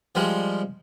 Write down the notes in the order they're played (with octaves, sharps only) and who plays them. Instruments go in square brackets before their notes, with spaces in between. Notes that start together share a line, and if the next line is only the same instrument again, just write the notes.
[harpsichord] F3 G3 G#3